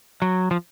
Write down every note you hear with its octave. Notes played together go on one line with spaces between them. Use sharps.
F#3
F3